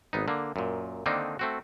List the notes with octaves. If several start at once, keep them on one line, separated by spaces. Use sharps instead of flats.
G#1 B3 D#4
D3 A#3
F#2 A#2
D3 D#3 A#3 C4 D4 D#4
A3 C4 F#4